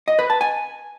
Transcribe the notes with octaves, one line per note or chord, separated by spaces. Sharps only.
D#5
B4
A5
G#5